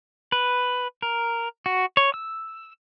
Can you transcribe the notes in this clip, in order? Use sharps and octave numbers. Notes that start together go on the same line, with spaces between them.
B4
A#4
F#4
C#5
E6